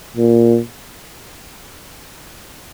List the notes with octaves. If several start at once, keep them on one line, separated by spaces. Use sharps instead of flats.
A#2